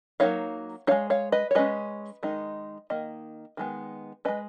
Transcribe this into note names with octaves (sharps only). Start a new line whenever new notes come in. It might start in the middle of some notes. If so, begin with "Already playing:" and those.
F#3 A#3 D#4 C#5 F5
G#3 D#4 C#5 F5
C#5 F5
B4 D#5
C#5
G#3 C#4 B4 D#5
D#3 G#3 D#4
D#3 A#3 D#5
D#3 G#3 B3
G#3 C#4 B4 D#5